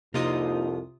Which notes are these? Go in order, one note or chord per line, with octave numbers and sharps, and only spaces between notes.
C2 F2 C3 A#3 D#4 F4 D#6